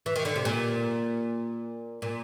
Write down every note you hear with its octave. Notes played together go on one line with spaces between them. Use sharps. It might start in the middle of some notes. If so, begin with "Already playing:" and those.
E3
D#3
D3
C3
A#2
A#2